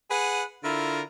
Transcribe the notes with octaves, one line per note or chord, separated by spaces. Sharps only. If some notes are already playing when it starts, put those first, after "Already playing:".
G#4 B4 F#5
D3 E4 F4 A#4